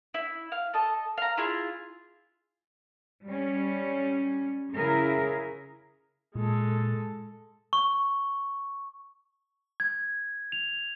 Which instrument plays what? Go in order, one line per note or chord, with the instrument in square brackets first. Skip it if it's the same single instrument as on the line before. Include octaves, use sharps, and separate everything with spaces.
[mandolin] E4
F5
A4 D#5 A5
F5 A#5
E4 F4 G#4
[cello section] G3 C#4
C#3 E4 G#4 A#4
[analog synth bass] A#2 [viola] G#3 A4
[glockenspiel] C#6
G#6
F7